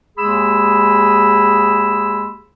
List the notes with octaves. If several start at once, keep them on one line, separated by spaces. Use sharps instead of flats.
D#2 G#3 G#4 B5 E6